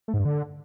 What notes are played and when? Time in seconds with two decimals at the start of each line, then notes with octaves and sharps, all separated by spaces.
0.08 A3
0.14 G#2
0.19 G2
0.25 D3